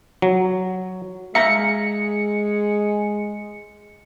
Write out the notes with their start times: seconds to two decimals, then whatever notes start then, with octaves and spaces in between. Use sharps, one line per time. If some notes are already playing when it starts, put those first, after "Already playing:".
0.22 F#3
1.35 G#3 E5 F5 A#5 C#7